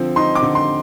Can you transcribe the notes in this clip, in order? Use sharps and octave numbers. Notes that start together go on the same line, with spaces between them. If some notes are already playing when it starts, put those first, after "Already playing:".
Already playing: D3 F3 C4
D#4 C6
D6
D3
C6